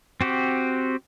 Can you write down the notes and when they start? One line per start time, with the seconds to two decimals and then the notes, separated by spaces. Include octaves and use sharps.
0.21 C4 F#4 G4